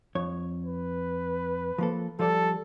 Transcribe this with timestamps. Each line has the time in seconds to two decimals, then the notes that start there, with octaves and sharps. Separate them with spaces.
0.15 F2 C#5
0.66 B4
1.78 F3 A#3 A4
2.19 F3 G3 A4 D5